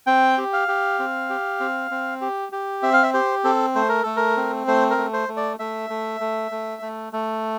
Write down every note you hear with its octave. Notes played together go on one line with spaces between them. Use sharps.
C4 G5
G4
F5
G4
C4
G4
C4
C4
G4
G4
C4 E5
F5
E5
G4 C5
C4 A4
A3 C5
A#4
A3 A4
A#4
C4
A3 C5
A#4
A3
C5
A3
D5
A3 E5
A3
A3
A3
A3
A3